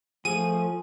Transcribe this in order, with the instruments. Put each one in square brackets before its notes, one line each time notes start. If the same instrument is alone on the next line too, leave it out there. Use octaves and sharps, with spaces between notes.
[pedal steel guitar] F3 [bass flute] A3 [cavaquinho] G#4 [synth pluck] D#7